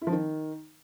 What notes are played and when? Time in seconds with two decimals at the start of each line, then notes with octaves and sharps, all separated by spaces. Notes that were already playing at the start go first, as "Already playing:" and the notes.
0.02 E4
0.07 F3
0.12 D#3